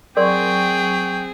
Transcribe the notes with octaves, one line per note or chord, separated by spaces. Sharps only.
F#3 C4 G#4 A#4 D5 G5 C6 C#6